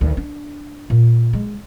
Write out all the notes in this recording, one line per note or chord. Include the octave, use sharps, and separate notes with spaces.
D2 D#3
D4
A#2
G#3